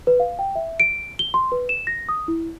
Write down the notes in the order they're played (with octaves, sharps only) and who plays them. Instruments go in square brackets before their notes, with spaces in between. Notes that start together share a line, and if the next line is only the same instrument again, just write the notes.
[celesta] B4
F5
G5
E5
D7
G7
C6
B4
E7
A#6
D#6
E4